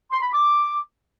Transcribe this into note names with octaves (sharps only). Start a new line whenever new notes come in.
C6
B5
D6